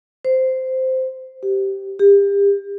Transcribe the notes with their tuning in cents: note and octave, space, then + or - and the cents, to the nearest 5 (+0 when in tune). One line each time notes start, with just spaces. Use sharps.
C5 -10
G4 -10
G4 +35